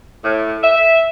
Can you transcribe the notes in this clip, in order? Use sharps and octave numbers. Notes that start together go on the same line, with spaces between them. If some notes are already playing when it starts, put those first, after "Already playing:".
A2
E5